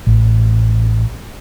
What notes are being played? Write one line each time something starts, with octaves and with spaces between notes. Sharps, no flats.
A1